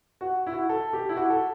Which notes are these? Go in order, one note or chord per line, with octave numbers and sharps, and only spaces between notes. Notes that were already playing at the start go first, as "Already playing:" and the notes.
F#4
E4
F#4
A4
G4
E4
F#4
A4